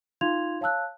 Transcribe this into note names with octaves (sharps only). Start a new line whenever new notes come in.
D#4 F4 F5 C6 G#6 F7
C#5 F5 A5 E6 F#6